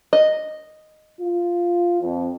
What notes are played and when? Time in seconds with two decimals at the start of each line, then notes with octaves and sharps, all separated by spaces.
0.13 D#5
1.20 F4
2.01 F2